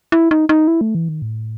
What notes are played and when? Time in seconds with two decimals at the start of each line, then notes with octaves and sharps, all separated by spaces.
0.12 E4
0.31 D#4
0.49 D#4
0.68 E4
0.81 A3
0.95 E3
1.09 D#3
1.22 A2